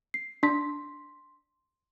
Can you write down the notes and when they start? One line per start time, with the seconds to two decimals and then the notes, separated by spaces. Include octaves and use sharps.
0.14 C7
0.43 D4 C6 B6